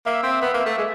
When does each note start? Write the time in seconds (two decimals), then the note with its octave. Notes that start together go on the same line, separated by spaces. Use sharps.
0.06 A#3 E5
0.23 C4
0.42 B3
0.54 A#3
0.66 A3
0.78 G#3